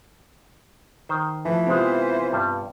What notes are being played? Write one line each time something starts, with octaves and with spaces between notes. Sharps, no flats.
D#3 C5
E3 F3 A3
C3 G#3 B3 F4 G4 C5
G2 G3